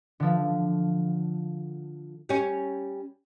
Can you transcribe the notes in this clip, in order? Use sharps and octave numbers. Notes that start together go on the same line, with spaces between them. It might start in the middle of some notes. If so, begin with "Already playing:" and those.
D3 F3
G3 C#4